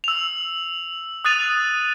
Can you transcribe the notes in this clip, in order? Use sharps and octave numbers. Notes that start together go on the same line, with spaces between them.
E6 F7
D#6 F#6 A6 D#7 F7